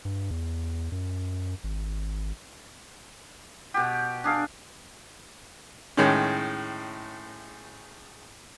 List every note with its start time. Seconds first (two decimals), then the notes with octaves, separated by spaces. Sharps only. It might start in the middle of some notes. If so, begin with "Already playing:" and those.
0.05 G2
0.31 E2
0.92 F#2
1.64 G#1
3.74 B2 G4
4.24 D4 G#4 F5
5.97 A2 D#3 G#3 C#4